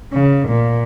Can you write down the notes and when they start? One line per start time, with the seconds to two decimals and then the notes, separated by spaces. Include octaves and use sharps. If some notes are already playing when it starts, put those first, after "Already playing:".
0.13 C#3
0.49 A#2